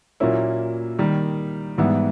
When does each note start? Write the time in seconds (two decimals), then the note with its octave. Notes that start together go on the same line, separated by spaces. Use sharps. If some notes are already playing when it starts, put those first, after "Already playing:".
0.20 A#2 F#3 A#3 C#4 E4
0.99 D#3 G3 A#3
1.78 G#2 E3 G3 B3 E4